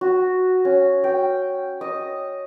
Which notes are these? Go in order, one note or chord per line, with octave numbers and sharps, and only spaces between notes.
F#4
C#4
G5
D#5